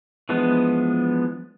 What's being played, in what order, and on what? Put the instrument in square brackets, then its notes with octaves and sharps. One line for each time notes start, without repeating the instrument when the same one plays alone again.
[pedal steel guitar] E3 F3 G#3 B3 D4